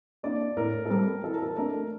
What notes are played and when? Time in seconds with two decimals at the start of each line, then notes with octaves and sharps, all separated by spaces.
0.23 A#3 D4 D5
0.57 A2 A#4
0.85 A4
0.90 G3 C4 A#4
1.24 E3 A4
1.33 A#4
1.42 A4
1.57 A3 D4 A#4